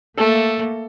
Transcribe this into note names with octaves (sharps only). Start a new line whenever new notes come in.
A3 A#3 A4